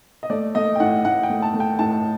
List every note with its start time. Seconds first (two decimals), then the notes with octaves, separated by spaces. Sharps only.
0.23 D#5
0.30 A3 D5
0.55 A3 D#5
0.75 G5
0.80 A2 F#5
1.05 A2 F#5
1.23 G5
1.30 A3
1.42 A5
1.54 A3
1.60 G5
1.79 A2 A5